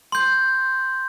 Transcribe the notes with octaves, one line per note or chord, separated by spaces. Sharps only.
C6 G6